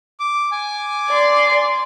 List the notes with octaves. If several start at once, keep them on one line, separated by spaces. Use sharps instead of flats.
D6
G#5 D6
D5 C6